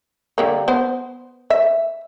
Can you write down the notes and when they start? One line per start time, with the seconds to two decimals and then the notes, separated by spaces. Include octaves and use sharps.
0.38 D3 G3 A#3
0.68 B3 C5
1.50 E5